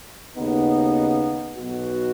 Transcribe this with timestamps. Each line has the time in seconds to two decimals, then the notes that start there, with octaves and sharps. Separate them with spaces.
0.36 D#2 C#3 B3 D#4
1.57 B1 B2 B3 F#4